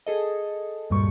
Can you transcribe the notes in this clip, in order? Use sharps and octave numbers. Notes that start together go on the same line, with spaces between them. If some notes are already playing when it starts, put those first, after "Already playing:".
G#4 A4 D#5
D2 G2 A#2 G3 C#6